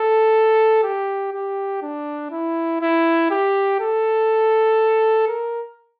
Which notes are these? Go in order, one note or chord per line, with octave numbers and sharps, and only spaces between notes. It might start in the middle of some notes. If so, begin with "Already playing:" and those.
Already playing: A4
G4
G4
D4
E4
E4
G4
A4
A#4